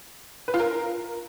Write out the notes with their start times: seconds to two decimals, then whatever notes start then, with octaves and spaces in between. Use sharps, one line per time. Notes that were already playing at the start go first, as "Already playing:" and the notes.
0.48 B4
0.54 F4
0.60 A#4